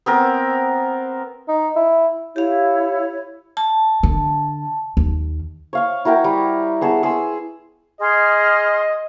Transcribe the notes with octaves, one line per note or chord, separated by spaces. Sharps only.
B3 C4 A#4
D#4
E4
E4 G4 C#5 F5
A5
D3
D#2
C#5 F5 C#6
E4 F#4 A#4 G5
G3
B3 G#4 C#5 A5
G#4 C6 E6
G#4 D#5 C6 F6